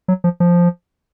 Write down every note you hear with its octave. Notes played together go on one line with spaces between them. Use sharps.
F#3
F3
F3